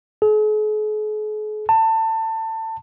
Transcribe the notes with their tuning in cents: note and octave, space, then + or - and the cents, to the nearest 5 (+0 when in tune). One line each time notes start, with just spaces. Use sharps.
G#4 +45
A5 +25